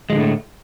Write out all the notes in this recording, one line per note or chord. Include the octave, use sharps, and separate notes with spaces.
A2 D3 F3 G#3 A3